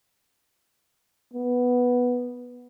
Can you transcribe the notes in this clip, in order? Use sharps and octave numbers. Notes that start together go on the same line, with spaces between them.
B3